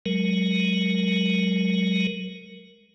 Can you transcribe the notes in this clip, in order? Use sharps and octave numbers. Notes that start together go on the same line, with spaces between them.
F#3 G#3 A#4